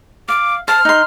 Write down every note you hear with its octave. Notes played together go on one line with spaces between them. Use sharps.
F5 D6
C5 A5 F6
D#4 C6